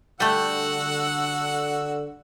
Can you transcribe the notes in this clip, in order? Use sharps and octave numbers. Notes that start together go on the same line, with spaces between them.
D3 G3 A3 F#4 F#5 E6